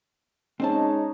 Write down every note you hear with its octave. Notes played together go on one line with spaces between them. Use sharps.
G#3 C4 C#4 D#4 C5 A5